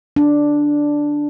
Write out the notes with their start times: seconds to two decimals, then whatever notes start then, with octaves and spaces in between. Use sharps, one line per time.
0.16 D4